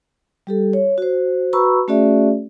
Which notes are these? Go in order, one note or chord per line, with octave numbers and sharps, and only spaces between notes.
G3 G4 A4
C#5
F#4 C5
F#4 B4 A#5 B5 C#6 E6
A3 C#4 F#4 G#4 D5 E5